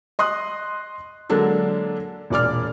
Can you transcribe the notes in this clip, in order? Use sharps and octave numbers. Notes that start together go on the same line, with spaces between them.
D#5 C6 D#6 F#6
D3 F#3 G#3 A#3 D4 A4
E1 A#2 D5 D6 F6